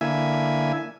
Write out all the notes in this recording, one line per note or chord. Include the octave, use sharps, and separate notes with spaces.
D3 A#3 E4 E5 G#5